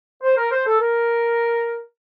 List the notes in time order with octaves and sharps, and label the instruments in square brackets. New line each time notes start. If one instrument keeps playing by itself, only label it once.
[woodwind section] C5
A#4
C5
A4
A#4